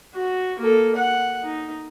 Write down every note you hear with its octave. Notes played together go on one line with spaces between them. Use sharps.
F#4
A#3 A4
F#5
D#4